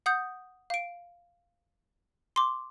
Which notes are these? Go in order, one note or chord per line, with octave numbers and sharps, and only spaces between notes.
F#5 D#6 G6
F5 D7
C6 D6